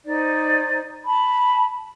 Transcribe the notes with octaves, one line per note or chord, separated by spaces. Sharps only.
D#4 C5 D5
A5 B5